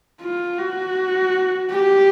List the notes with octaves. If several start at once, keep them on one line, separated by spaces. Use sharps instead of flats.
F4
F#4
G4